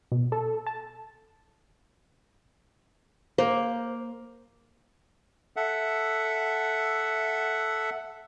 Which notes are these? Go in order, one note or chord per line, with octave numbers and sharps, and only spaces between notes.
B2
A4
A5
A#3 C5
A4 E5 F#5